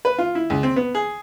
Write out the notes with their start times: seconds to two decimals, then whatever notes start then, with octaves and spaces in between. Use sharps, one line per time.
0.05 B4
0.18 F4
0.35 E4
0.50 C#2
0.63 C4
0.76 B3
0.95 G#4